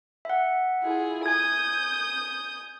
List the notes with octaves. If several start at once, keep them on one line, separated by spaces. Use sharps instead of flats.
E5 F#5
E4 F4 G#4
G#5 D#6 G6 G#6